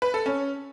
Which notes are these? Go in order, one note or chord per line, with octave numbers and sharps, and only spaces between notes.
B4
A4
C#4